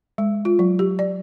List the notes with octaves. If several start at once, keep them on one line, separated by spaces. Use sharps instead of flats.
G#3
F4
F#3
G4
D5